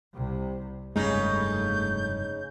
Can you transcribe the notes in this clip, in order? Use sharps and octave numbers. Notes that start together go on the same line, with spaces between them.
C2 C3
F1 G2 C#3 G#3 A3 D#4 G6